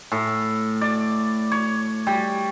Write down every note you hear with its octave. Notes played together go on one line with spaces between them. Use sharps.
A2
D5
C#5
G3